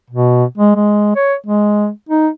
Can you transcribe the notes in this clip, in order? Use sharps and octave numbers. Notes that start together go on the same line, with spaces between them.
B2
G#3
G#3
C#5
G#3
D#4